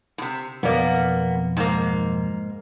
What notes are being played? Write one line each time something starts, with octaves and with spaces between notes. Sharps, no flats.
A2 C3
B1 F2 A#3 B3 D5
G#2 A#3